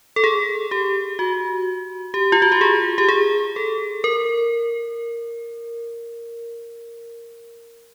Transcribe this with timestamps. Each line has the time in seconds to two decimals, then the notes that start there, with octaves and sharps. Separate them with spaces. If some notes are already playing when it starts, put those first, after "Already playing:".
0.16 A4
0.24 G#4
0.71 G4
1.19 F#4
2.14 G4
2.32 F4
2.42 F#4
2.52 G4
2.61 G#4
2.98 G4
3.09 G#4
3.56 A4
4.04 A#4